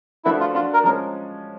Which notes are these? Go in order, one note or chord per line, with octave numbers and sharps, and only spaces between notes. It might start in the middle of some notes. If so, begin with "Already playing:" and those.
F3 A3 D4 E4 F#4 B4
F4
A3 D4 F4 F#4
A#4
F3 G#3 C#4 A#4